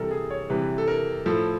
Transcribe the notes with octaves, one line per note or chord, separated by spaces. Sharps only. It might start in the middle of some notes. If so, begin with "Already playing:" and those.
Already playing: C3 E3 G3 A4 A#4
G#4
C#5
C3 E3 G3 B4
A4
A#4
A2 F3 A4